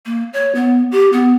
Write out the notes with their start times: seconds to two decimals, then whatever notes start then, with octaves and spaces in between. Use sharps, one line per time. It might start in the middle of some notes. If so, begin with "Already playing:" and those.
0.06 A#3
0.33 C#5
0.55 B3
0.92 G4
1.13 B3